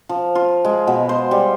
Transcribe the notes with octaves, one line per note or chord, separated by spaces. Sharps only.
F3
F4
G#3
B2
C5
G3